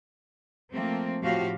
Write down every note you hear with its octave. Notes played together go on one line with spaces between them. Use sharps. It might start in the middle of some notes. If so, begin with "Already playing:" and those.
F3 A3 A#3 C4
A2 F3 F#4 G4 F5